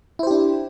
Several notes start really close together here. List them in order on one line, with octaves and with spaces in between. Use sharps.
E4 C5 G4 D4